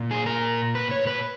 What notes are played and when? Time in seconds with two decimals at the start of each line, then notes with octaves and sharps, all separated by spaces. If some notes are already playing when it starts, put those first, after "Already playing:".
Already playing: A#2
0.11 G#4
0.26 A#4
0.75 B4
0.91 C#5
1.07 B4